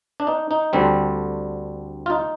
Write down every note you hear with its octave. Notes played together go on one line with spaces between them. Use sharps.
D4
D#4
D#4
D2 D3 G3 C4
F4
D#4